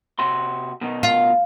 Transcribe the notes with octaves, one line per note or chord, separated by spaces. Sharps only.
C3 F#4 C6
B2 D#3 D#4
F4